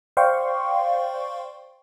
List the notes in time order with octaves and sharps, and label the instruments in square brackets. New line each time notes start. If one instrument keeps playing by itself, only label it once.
[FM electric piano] C5 D5 F5 G5 C6 C#6